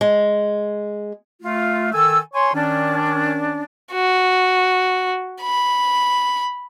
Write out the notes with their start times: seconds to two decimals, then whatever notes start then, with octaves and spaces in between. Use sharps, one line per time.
0.01 G#3
1.42 A3 F4
1.93 D#3 A4 G#5 E6
2.34 C#5 G#5 C6
2.54 D#3 C#4 D4
3.93 F#4
5.42 B5